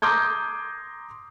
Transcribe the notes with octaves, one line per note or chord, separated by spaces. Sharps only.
A#5 C6 D6 D#6 G6 G#6